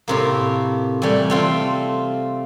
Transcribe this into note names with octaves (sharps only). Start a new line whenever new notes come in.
A2 C3 A#3
E3 G3 A3
A3 C4 F4